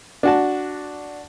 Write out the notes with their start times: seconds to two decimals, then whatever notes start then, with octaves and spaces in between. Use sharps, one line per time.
0.23 D4 F#4 A5